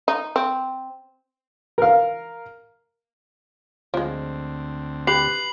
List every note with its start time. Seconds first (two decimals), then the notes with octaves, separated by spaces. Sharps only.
0.08 D#4
0.36 C4
1.78 A#4 F5
3.94 D2 F3 G#3 C4
5.07 G4 B4 C7 F#7